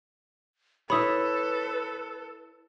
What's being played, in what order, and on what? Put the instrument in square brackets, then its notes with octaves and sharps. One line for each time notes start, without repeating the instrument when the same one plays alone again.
[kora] E4 C#5 [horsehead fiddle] A4 [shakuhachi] B4 [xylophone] B5 D#6